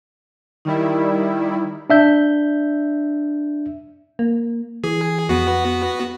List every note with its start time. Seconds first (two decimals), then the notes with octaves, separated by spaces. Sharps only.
0.65 D#3 G3 D#4 E4
1.90 D4 E5 G6
4.19 A#3
4.84 E3 G#4
5.29 F2 B3 F#4